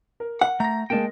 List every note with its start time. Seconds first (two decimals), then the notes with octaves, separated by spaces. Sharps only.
0.20 A#4
0.41 F#5
0.60 A3 A#5 A#6
0.90 G#3 A#3 G5 A5